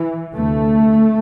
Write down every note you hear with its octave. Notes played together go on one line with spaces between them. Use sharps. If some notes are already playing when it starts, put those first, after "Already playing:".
Already playing: E3
D2 C3 A3